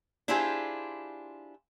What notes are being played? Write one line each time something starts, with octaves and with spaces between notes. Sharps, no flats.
D4 E4 F4 G4 G#4 C5